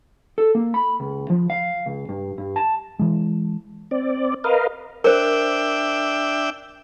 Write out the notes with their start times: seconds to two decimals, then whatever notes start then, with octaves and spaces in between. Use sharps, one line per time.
0.38 A4
0.55 A#3
0.74 B5
1.00 C#2
1.30 F3
1.50 F5
1.86 C#2
2.09 G2
2.38 G2
2.56 A5
2.99 E3 G#3
3.91 C4 D5
4.44 A#4 B4 D#5 F5
5.04 D4 A#4 C5 E5 G5